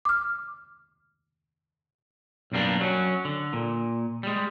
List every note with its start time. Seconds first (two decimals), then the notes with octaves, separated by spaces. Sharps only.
0.05 D6 F6
2.52 B1 F#2 G3 A#3 D4
2.81 F#3 C#4
3.25 D3
3.53 A#2
4.23 G3 G#3